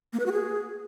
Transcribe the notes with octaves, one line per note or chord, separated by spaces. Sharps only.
A#3
B4
F#4
G#4